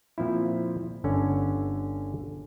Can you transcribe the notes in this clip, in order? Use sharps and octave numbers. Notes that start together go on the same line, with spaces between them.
A#2 F3 C4 E4
G1 D3 C#4 A4